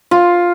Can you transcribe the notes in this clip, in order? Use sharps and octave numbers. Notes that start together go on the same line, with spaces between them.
F4